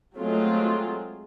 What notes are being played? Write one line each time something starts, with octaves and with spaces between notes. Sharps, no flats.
F#3 G#3 A3 C4 F4 G#4